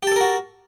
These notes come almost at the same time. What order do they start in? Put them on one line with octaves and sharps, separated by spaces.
G4 A5 A4 A#4 F#4